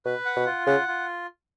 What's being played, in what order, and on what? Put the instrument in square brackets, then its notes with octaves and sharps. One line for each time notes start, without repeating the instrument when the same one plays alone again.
[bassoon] B2 [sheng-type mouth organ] B4
[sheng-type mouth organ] F#5
[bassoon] B2
[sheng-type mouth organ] F4
[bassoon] C#3 [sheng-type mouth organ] F#5
[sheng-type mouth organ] F4